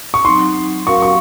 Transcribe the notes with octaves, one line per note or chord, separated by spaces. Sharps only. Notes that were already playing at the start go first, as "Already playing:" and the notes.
C#6
F#3 C4 D#4 C6
F#3 C#4 F#4 A#4 F5 C#6
C#6